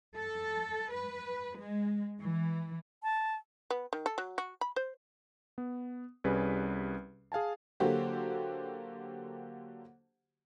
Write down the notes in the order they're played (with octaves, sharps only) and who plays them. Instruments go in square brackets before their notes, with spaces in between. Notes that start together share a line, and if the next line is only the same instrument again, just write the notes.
[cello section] A4
B4
G#3
E3
[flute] A5
[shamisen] B3
D#3
A4
F#3
F#4
B5
C5
[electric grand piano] B3
C2 G3 C#4 G#4 B4
G#4 F5 G#5 A5
[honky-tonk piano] D3 F#3 A#3 F#4 G4 C5